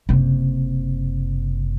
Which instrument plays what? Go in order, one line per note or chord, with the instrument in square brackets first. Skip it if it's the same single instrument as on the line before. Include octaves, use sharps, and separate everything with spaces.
[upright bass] F#1 C3